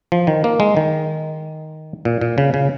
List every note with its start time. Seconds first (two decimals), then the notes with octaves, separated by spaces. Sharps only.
0.12 F3
0.27 D#3
0.44 A#3
0.60 G#3
0.77 D#3
2.05 A#2
2.21 A#2
2.38 C#3
2.54 C#3